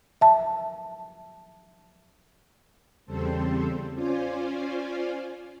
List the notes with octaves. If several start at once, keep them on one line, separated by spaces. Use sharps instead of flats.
E5 A5
E2 C#3 G3 C4 A4 C5
C#4 F4 C5 D5 G#5